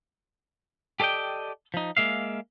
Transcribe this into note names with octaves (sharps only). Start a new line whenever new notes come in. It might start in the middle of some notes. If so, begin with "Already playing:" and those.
G4 A4 D5 D#5 G5
F3 D#4
G#3 A#3 E5 F5